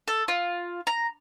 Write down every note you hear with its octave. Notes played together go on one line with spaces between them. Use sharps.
A4
F4
A#5